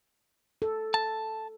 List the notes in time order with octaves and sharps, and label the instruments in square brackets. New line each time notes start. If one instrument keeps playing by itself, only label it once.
[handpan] A4
[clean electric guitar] A5